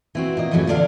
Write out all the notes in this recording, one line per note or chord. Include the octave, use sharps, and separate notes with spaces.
E3 C4 F#4
A#2 D#5
F2 G#2 E3 F#3 A3
A#2 D3 D4 G4 F5 F#5